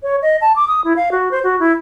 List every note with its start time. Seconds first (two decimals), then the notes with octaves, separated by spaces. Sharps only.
0.03 C#5
0.22 D#5
0.41 A5
0.56 D6
0.68 D#6
0.84 E4
0.96 F5
1.12 F#4
1.31 C5
1.43 F#4
1.60 E4